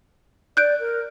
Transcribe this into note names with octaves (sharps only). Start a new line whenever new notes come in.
D5 F#6 G6 D7
A#4